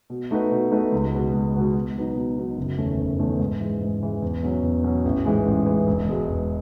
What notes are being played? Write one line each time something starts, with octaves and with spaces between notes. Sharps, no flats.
B2
A3 D#4 F#4 B4
B2
A3 D#4 F#4 B4
C#2
B2 G#3 B3 F#4
C#2
B2 G#3 B3 F#4
B2
F#3 B3 D#4
B2
F#3 B3 D#4
F#1
E2 D#3 A3 C#4
F#1
E2 D#3 A3 C#4
G#2
E3 G#3
G#2
E3 G#3
E2
B2 F#3 C#4
E2
B2 F#3 C#4
A1
G#2 E3 G#3
A1
G#2 E3 G#3
E1
E2 B2 G#3
E1